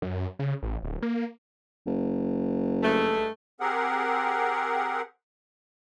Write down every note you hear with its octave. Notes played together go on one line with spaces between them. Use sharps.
F#2
C#3
A1
D1
A#3
F#1
G2 G#3 A3
C4 G4 G#4 A#4 F#5